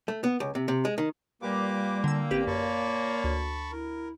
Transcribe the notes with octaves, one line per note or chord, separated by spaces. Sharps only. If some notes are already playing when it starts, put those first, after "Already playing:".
A3
B3
C#2
C3
C3
G#3
D#3
A#2 G3 A#3 G4 B4 D6
D3 G5 A#5 E6
A1 C4 G4 B4
F#2 C#5 A5 B5 C#6
D2
E4 A#4